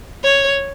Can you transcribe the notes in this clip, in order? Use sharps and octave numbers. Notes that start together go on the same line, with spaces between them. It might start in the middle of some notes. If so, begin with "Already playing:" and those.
C#5